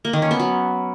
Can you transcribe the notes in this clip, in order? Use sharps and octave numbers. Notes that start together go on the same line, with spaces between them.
A#3
D#3
C#4
B3
F#3